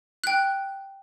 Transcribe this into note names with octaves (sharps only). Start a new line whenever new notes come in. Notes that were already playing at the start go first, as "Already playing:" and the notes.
G5 F#6